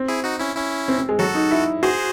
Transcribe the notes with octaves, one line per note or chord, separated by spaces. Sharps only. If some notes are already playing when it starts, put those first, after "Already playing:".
Already playing: C4
E4 G#4
D#4 F#4
C#4 E4
C#4 E4
C4
C4
G#3
F#3 F#4 A4
D#4
E4
F#4 G#4 C5